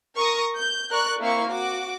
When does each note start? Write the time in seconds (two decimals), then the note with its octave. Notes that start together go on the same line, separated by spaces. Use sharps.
0.18 A#4 C#6 D#6 A#6
0.57 G6
0.91 A#4 D5 C#6 F#6
1.20 A#3 C4 E4 F5 C#6
1.50 F#4 D6